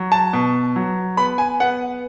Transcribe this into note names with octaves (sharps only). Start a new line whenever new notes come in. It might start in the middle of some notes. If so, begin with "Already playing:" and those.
Already playing: F#3
A5
B2
F#3
B3 B5
G#5
B3 F#5